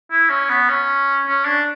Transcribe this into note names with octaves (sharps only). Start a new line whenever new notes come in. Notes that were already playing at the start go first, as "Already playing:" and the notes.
E4
C#4
B3
C#4
C#4
D4